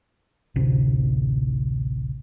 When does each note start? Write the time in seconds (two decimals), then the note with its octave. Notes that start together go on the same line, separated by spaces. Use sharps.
0.56 A1 D2 C3